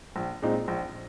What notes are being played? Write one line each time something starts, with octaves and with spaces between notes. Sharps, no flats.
A#1
A#2 G#3 C4 D#4
A#1